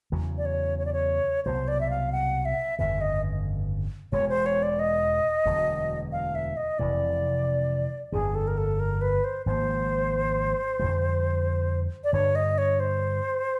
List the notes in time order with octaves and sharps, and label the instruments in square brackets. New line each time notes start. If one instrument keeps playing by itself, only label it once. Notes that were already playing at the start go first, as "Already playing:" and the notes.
[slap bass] E2 C#3 F#3
[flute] D5
C#5
C#5
D5
C#5
[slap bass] C2 B2 F#3 [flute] C5
[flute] D5
E5
F5
F#5
E5
[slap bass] G1 F2 C#3 [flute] E5
[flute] D#5
[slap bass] E1 E2 B2 G#3 [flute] C#5
[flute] C5
C#5
D5
D#5
[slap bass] E1 D2 D3 F#3
[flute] F5
E5
D#5
[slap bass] F1 F2 C3 E3 [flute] D5
[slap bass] G1 F2 D3 [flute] G#4
[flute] A4
A#4
A4
A#4
B4
C5
[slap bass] G#1 G#2 F3 A#3 [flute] C5
[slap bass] F2 D3 G3
[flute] D5
[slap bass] G2 D3 G3 [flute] C#5
[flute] D#5
C#5
C5